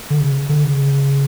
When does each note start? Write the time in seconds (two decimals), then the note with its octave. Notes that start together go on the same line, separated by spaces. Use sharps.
0.10 D3
0.21 C#3
0.49 D3
0.64 C#3